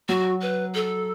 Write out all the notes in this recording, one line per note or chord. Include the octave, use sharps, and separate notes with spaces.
F#3 F#4
B4
A4